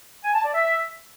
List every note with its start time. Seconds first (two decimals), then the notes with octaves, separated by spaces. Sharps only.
0.24 G#5
0.34 A5
0.44 D5
0.54 E5